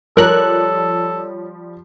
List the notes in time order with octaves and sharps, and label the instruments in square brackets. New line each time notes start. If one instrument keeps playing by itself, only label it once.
[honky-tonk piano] F3 G3 [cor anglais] A4 [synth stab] A#4 F#6 [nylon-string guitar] C#5